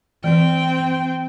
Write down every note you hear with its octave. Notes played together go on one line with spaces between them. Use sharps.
E3 C4 G5